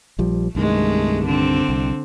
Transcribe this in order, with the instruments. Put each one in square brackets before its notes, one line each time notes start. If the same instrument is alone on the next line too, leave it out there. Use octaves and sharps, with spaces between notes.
[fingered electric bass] A#1 F3 G3
[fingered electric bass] C2 G2 D#3 [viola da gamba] G#3 A3
[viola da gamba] D3 C4
[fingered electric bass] C2